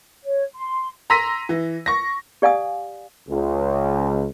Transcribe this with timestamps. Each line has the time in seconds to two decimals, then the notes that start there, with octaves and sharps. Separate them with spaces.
0.24 C#5
0.56 C6
1.10 A#5 C6 E6 A#6 B6 D#7
1.49 E3
1.86 C#6 A#6
2.42 G4 D5 F5 G#5 D#6
3.29 C#2